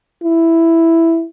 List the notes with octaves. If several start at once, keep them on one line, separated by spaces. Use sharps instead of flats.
E4